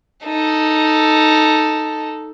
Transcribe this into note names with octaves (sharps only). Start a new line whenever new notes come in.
D#4 A4